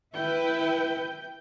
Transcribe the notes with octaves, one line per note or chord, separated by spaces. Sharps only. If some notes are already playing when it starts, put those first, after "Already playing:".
E4 B4 G5